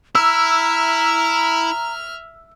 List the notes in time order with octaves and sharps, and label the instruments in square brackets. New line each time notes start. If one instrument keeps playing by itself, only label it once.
[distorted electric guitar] E4 [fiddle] E5 F6 [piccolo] A#5 [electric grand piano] E6